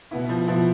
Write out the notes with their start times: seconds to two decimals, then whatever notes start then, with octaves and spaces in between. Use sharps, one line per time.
0.11 B2 B3 E4
0.29 F3
0.47 B2 F3 B3 E4